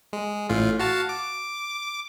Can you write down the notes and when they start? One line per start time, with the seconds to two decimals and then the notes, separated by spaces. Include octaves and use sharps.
0.13 G#3
0.50 A1 A2 F4
0.79 F#4 F5 A5
1.09 D6